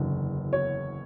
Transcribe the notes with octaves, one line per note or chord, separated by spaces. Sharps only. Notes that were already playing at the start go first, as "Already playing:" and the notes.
Already playing: F#1 E2 D3 F#3
C#5